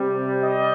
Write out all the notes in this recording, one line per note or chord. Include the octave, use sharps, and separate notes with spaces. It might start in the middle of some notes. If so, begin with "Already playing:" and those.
Already playing: C3 G3
D#5